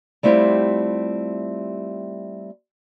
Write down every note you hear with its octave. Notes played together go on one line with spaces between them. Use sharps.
G3 A3 C4 E4 F4 G4